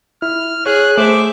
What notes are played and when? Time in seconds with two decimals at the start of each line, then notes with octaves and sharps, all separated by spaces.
0.22 E4 F6
0.66 G#4 C#5 F#6
0.98 A3 G#4 C5 E5 D6